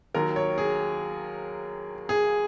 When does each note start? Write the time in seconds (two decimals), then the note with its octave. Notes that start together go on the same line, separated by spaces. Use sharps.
0.15 D#2 D#3 F#3 A#4
0.36 C#5
0.58 G#4
2.09 G#4